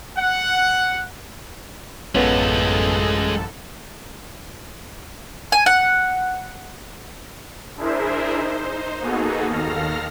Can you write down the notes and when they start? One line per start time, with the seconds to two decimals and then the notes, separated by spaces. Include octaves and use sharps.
0.17 F#5
2.15 A1 F#2 G#3 B3 C#4 F4 A4
5.52 G#5
5.66 F#5
7.77 D4 E4 G#4 A#4 C5 E5
8.34 D#4 C5
9.00 A#3 B3 D#4 F#4 G#4 A4
9.49 D#2 D#3 A4 F5 F6 A#6